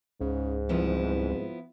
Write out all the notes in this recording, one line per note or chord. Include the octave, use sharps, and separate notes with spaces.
C#2 G#2 C#3
C2 F3 B3 E4